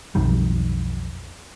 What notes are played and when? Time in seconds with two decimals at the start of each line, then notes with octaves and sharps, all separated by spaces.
0.15 B1 F2 D#3 G3